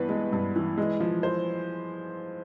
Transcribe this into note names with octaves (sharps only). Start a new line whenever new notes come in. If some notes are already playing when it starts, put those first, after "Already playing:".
Already playing: G2 E3 B3 B4
G#3
G2
E3
G#3
F3
C5